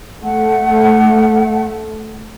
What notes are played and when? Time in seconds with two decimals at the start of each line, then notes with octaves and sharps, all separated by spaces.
0.24 A3 F#5